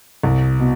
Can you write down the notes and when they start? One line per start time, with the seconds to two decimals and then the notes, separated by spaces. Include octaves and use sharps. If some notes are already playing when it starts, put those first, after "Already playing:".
0.23 C2
0.60 B2